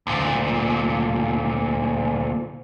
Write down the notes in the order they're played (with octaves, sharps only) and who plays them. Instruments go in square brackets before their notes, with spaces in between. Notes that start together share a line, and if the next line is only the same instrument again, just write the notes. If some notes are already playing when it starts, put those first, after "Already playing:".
[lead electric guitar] D2 A#2